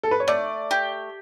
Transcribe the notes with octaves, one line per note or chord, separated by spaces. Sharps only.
A4
B4
C#5
A3 D5
G4